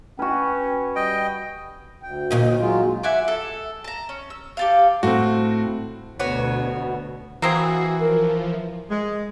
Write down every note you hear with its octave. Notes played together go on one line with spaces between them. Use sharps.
C#4 F#4 B4 G5
G3 D#5 G5
D2 G5
D#2 A#2 D#3
F#3 G#3 F4
E5 F#5 G#5 D6
A4
A5 A#5
C#4
E6
G4 A4 F5
A2 C4 F#4
D2 B2 B3 F#4 C#5
E3 A#3 C4 F#4 G#4
F3 A#4
G#3